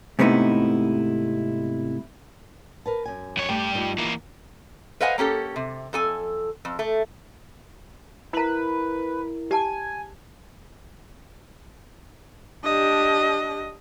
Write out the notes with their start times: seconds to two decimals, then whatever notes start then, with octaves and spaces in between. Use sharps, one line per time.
0.19 G#2 C3 A3 B3 D#4 E4
2.86 A#4 B4 A5
3.05 F#2 G#5
3.37 F2 C#5
3.49 G2 G3 A3 G4
3.75 F3 A3 D#4
3.98 E3 A#3
5.01 B4 C5 D#5 F5 F#5 G#5
5.18 A#3 C#4 G4 A4
5.56 C3
5.93 F2 A4 G#5
6.65 F2
6.79 A3
8.33 E4 A#4 B4 A#5 B5
9.51 G4 G#5 A5
12.64 D4 G4 D#5